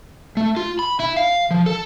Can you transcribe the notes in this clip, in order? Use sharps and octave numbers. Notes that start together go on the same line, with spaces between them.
A3
F4
B5
E4
F5
F3
A4